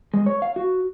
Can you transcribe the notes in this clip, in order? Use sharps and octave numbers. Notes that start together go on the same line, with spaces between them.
G#3
C#5
F5
F#4